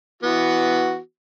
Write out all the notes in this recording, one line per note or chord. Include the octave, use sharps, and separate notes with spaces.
E3 B3 F#4